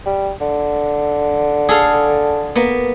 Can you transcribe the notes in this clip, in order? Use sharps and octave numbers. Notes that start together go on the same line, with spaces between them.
G3
D3
G#4 A4 F5
A#3 B3